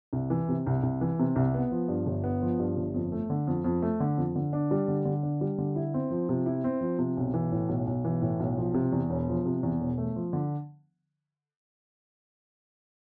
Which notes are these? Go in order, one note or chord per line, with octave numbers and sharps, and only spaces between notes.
C2
E3
C3
C2
C2
E3
C3
C2
B3
F3
G2
G1
B3
F3
G2
G1
F2
A3
D3
F2
F2
A3
D3
F2
D3
D4
G3
D3
D3
D4
G3
D3
E4
C4
F3
C3
E4
C4
F3
C3
B1
E3
A2
B1
B1
E3
A2
B1
F3
C3
E2
E1
F3
C3
E2
E1
A3
F3
D3